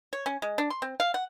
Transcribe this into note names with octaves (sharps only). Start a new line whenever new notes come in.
C#5
C#4
G#3
D4
C6
C4
F5
F#5